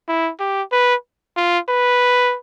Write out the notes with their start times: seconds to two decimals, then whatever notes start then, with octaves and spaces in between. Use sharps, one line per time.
0.08 E4
0.40 G4
0.72 B4
1.36 F4
1.69 B4